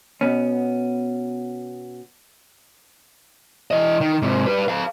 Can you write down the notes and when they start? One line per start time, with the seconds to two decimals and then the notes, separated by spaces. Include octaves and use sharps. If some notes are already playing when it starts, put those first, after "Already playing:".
0.21 B2 B3 C#4
3.71 E3 D#5
4.01 D#3
4.22 G#2 C3
4.46 G3 B4
4.68 A4 F5